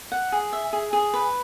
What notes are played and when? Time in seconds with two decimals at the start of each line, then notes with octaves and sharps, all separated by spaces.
0.12 F#5
0.32 G#4
0.53 E5
0.73 G#4
0.93 G#4
1.14 B4